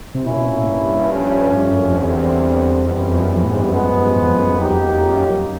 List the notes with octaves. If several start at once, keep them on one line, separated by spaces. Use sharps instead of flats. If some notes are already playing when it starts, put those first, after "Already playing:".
C3
B2 A#3 C#4 E4
B2
A#2
A2
G2
F3 A3 C#4
G2
F#2
F2
E2 D3 G3 C4
F2 E3 G3 B3
F#2
F2
F#2
F2
A2
G#2
G2
F#2 F3 G#3 B3
F#2
F#2
G2
G2
E2
F2
F#2
F#2
E2 F#3 A#3 D#4 G4
F2
E2
F2
F#2
F#2